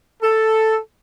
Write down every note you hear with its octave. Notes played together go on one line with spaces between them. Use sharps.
A4